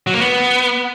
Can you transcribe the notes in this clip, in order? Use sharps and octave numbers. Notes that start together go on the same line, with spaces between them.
F#3
A#3
B3